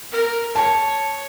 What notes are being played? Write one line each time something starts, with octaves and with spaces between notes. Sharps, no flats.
A#4
C#5 A5